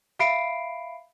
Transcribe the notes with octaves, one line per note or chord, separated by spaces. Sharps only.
E5 F5 B5 C7 D7